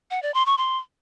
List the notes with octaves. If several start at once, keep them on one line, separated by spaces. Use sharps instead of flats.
F#5
D5
C6
C#6
C6